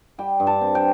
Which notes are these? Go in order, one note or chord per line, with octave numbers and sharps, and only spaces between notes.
G3 G5
G2
A5
C4
G5